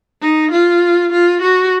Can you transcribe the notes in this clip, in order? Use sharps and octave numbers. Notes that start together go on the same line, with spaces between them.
D#4
F4
F4
F#4